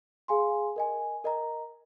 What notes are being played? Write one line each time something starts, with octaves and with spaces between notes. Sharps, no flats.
G#4 F5 G#5 C6
A#4 D#5 G#5
A#4 D#5 A#5